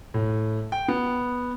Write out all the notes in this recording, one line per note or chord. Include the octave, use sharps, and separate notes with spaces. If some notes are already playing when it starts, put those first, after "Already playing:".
A2
G5
B3